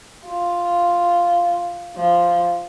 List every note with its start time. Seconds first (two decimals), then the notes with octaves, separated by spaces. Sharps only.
0.25 F4
1.96 F3